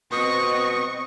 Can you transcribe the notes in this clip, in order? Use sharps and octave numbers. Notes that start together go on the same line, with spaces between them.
B2 C4 D#5 C#6 D#6